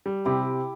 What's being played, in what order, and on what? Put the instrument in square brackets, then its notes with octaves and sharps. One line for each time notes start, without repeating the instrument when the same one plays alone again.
[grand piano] G3
[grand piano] C3 [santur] E4 G4